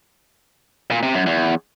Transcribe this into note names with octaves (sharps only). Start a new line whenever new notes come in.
A#2
C3
F#2
E2